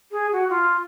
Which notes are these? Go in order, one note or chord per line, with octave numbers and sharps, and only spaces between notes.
G#4
F#4
F4